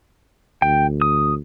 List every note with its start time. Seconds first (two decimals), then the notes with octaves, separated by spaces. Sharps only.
0.62 D2 G5
1.02 D#6